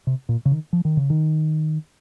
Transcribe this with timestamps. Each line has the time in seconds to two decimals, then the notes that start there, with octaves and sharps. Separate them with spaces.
0.07 C3
0.29 A#2
0.45 C#3
0.51 D#3
0.73 F3
0.85 D#3
0.97 C#3
1.10 D#3